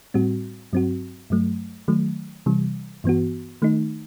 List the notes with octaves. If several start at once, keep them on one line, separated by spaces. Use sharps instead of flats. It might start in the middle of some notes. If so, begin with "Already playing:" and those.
A2 G3 C4 F#4
G2 F#3 C4 F#4
G2 F#3 A3
D#3 F#3 A3
C3 E3 G3
G2 E3 B3 F#4
D#3 A3 D#4